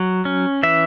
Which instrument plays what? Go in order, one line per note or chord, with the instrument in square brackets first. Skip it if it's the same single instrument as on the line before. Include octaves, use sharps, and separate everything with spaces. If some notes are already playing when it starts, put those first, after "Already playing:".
Already playing: [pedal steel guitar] F#3
C#4
E3 E5